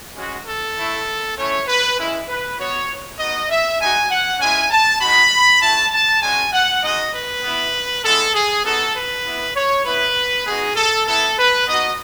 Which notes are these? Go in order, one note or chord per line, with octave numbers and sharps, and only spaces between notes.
G#3 C#4 F#4
A4
A3 E4
A3 C#4 E4 C#5
B4
G#3 C#4 E4
B4
B3 F#4 C#5
B3 D#4 F#4 D#5
E5
G#3 D#4 F#4 G#5
F#5
G#3 C#4 E4 G#5
A5
G#3 D#4 F#4 B5
A3 E4 A5
A5
G#3 C#4 F#4 G#5
F#5
G#3 D#4 F#4 D#5
B4
B3 E4
G#3 B3 E4 A4
G#4
B3 D#4 F#4 A4
B4
B3 E4
C#5
B3 E4 B4
G#3 B3 D#4 F#4 G#4
A4
B3 E4 A4
B4
B3 D#4 F#4 D#5